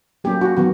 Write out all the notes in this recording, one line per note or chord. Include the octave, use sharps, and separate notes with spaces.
F#3 A#3 C#4 G4
F#4
D#3 F#3 B3 F#4